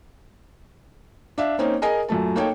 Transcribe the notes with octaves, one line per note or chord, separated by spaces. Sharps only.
D4 E5 F5
A#3 C4 C#4 D#4
G#4 A#4 D#5 G#5
F#2 A#2 A3 A5
A#3 D#4 A4 C#5 G5